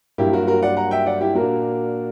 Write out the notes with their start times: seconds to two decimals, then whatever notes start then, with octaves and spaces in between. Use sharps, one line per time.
0.18 G2 F#3 A#3 E4 G4
0.33 F#4 A#4
0.47 F#4 A#4
0.63 D5 F#5
0.77 F#5 A#5
0.91 E5 G5
1.06 D5 F#5
1.21 E4 G4
1.35 A#2 A#3 D4 F#4 A#4